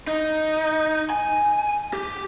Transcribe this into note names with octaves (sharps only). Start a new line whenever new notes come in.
D#4
G#5
G4